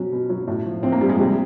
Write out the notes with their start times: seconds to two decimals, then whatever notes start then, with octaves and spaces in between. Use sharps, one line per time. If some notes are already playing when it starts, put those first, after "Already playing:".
Already playing: B2 F#3 C#4
0.12 B2
0.30 F#3
0.47 A2
0.66 F3
0.83 A2 C4
0.92 A#3
1.01 F3 G3
1.09 G#3
1.19 C3 G3